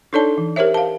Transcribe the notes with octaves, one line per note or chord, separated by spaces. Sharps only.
D4 D#4 A4 C#5 D5 A5
E3
G4 A#4 C5 C#5 E5
F5 A5